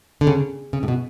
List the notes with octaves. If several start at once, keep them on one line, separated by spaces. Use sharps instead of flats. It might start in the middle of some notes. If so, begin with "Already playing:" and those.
D3
C#3
C#3
A2
B2